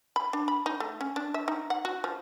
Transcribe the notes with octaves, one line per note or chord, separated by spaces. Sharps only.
B5
D4
B5
D#4
A3
C#4
D4
E5
D#4
F#5
F#4
F3